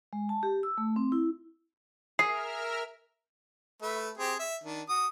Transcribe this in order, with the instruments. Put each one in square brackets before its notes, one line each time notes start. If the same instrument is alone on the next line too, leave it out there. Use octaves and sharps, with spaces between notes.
[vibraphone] G#3
A5
G4
E6
A3
C4
E4
[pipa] G#4 [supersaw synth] A#4 E5 F6 [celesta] C7
[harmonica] A3 B4 E5
C4 G4 G#4
E5
D#3 D4
F#4 D#6